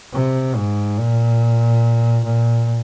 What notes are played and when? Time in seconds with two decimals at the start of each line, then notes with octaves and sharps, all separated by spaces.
0.13 C3
0.55 G#2
0.98 A#2
2.25 A#2